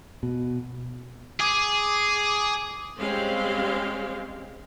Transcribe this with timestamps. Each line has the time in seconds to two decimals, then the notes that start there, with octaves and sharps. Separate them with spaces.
0.23 B2
1.40 G#4 D6
2.99 G3 G#3 C4 C#4 G4 F5